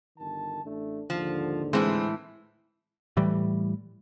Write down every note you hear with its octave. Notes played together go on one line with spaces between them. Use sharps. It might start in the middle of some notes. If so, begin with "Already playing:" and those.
G1 D#3 A5
A1 A3 D4
D#2 G#2 D3 F3
A2 E3 G#3 C4
A2 E3 G3